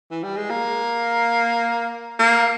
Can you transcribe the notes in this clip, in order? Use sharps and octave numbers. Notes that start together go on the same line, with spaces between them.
E3
G3
G#3
A#3
A#3